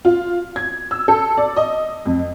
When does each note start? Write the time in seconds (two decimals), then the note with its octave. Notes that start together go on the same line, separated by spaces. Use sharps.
0.05 F4
0.56 G#6
0.91 E6
1.08 A4
1.37 D5
1.56 D#5
2.05 F2